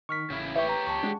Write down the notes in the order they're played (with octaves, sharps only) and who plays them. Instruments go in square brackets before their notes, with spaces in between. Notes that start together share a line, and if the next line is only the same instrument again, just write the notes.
[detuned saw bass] D#3 [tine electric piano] C#6 F6 B6
[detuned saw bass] A1 [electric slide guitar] C#3 E4
[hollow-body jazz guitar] E4 E5 [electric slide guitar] G4 C#5 [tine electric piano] B4 C#6
[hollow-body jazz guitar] A#5
[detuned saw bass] C#2 [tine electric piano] A5 C#6
[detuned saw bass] G#3 [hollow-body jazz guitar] D4 F#4 G#4